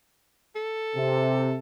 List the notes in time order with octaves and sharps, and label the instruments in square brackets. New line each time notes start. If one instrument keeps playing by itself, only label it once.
[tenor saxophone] A4
[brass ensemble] C3